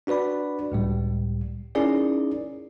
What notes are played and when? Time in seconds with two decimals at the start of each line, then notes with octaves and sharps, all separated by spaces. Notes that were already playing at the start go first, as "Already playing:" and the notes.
0.07 D4 F#4 B4 D5 B5
0.72 C#2 A2 G3
1.75 C#4 D#4 E4 G#4 A#4 D5